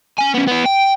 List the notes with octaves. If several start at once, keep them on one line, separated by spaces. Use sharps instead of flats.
C#4 G#5
B3 C#4
B3 E4
G5